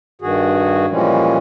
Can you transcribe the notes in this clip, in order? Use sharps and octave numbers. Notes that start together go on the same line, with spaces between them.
G2 D#3 F#4 G#4
A#2 E3 F3 G3 G#3 C#4